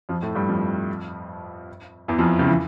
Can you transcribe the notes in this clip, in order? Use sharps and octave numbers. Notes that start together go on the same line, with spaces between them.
F2 F3
A2 A3
G2 G3
F2 F3
E2 E3
F2 F3
C#2 C#3
E3